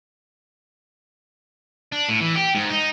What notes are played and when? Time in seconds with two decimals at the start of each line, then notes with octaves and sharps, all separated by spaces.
1.92 D4
2.08 A2
2.21 E3
2.36 G4
2.55 G#2
2.70 D#4